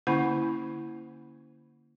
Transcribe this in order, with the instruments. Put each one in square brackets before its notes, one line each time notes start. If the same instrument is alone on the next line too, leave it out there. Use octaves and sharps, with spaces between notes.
[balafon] D3 A#3 C#4 E4 F#5 B5